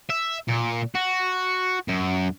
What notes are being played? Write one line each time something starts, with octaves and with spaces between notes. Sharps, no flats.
E5
A#2
F#4
F#2